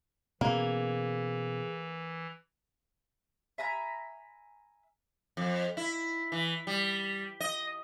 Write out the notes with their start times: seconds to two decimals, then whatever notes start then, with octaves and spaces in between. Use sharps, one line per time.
0.41 B2 E3 A#3 B3 C#4 G#4
3.58 E5 G#5 A#5 B5
5.37 F2
5.77 E4
6.32 E3
6.67 G3
7.40 D#5